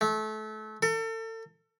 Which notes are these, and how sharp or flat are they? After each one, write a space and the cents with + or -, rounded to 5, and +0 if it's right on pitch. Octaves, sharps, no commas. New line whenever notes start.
A3 -25
A4 +35